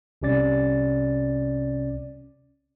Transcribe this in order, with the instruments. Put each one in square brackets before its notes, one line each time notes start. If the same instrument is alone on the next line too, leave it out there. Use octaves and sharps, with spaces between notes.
[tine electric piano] C2 C3 C#4 D5 A6